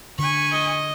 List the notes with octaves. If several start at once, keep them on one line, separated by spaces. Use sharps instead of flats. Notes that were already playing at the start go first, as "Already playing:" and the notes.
D3 G#5 B5 C#6
D#5